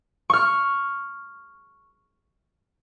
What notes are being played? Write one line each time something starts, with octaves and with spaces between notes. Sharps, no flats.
C#6 F6